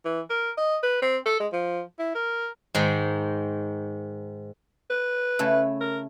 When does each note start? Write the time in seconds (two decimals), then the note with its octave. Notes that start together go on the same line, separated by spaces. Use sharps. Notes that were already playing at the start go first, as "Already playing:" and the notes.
0.05 E3
0.30 A#4
0.57 D#5
0.83 B4
1.02 C4
1.26 A4
1.40 G#3
1.52 F3
1.99 E4
2.15 A#4
2.75 G#2 D#3 G#3
4.90 B4
5.39 C#3 A3 E4
5.81 A#4